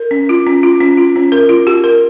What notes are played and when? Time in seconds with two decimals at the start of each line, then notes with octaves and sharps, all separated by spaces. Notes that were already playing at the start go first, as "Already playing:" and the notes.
Already playing: A#4
0.11 C#4
0.29 F4
0.47 C#4
0.63 F4
0.80 C#4
0.97 F4
1.16 C#4
1.32 A#4
1.49 F4
1.67 G4
1.84 A#4